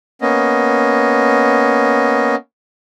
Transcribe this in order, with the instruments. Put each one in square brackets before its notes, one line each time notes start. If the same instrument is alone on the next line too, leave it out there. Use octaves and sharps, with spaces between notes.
[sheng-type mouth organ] A#3 B3 C#4 D#5